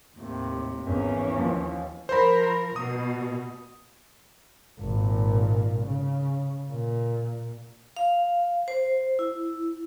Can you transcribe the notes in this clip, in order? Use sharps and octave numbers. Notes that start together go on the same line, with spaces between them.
D#2 A2 C3
G#1 E2 E3 C#4
D#2 F3
F3 A#4 C5 B5
B2 D#6
G#1 A#2
C#3
A#2
F5
C5
E4